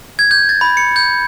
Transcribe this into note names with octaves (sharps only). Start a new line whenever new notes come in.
G#6
G6
A6
B5
C#7
G6